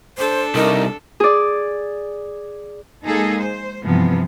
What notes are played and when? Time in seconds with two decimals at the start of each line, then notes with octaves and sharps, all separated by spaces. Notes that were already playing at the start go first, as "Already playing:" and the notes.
0.18 D4 A4 C5
0.55 C2 D#4 A#4
1.20 G#4 D5
3.05 G#3 A#3 D#4 G#4 A4
3.39 C5
3.83 G2 C3 E3 F3 B3